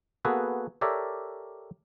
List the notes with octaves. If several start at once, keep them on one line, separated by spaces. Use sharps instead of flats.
A#3 B3 F#4 G#4 A4 B4
G4 A4 A#4 C#5 D5 E5